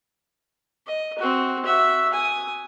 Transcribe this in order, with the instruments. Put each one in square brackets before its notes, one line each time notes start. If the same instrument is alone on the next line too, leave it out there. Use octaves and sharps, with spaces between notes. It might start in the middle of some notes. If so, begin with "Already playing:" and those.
[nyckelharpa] D#5
C4 F#4
F#4 E5
G#5 D#6